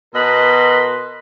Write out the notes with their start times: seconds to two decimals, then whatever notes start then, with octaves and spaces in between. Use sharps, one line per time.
0.15 B2 A#4 B4 D#5 B5 C6